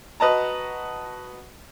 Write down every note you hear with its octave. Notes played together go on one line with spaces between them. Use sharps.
F#4 B4 D#5 A5 A#5